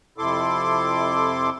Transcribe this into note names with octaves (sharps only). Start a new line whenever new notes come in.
F2 C3 E4 A4 C6 D6